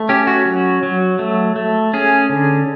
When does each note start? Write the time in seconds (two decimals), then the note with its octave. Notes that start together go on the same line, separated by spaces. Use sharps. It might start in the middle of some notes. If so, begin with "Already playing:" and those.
Already playing: A3
0.09 C#4 G4
0.27 F#4
0.46 F#3
0.83 F#3
1.19 A3
1.56 A3
1.93 C#4 G#4
2.29 D3